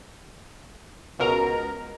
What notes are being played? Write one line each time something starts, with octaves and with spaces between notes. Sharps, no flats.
C#2 B2 A#4 A#5